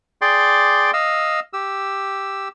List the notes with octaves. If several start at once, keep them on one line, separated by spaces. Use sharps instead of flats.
G#4 D5 G5 C6 D6
D#5 F5 E6
G4 E6